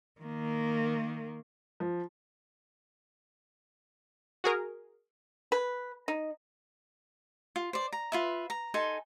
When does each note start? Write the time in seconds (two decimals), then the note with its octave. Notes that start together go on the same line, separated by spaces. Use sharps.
0.21 D#3 A#3
1.80 F3
4.44 F#4 G#4 A#4
5.52 B4
6.08 D#4
7.56 F4
7.73 C5 D5
7.93 A#5
8.12 F4 B4 E5
8.50 A#5
8.74 D#4 A4 G#5 C6